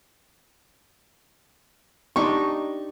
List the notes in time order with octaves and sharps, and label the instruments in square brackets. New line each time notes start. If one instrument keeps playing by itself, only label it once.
[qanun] D4 D#4 G4 [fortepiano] C#6